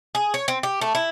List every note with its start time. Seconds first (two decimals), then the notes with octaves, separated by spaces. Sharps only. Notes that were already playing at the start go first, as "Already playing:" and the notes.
0.15 G#4
0.34 C#5
0.48 C4
0.63 G4
0.81 A3
0.95 E4